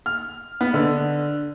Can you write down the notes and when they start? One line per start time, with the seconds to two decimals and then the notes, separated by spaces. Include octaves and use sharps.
0.06 F6
0.61 B3
0.74 D3